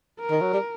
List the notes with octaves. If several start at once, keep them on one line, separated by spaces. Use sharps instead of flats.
A#4
D#3
F#3
G3